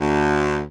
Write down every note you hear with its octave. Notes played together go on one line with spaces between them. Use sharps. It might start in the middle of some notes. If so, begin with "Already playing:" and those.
D2